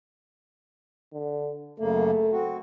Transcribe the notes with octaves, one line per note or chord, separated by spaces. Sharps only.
D3
F#2 C#3 A3 A#3
C4 F#4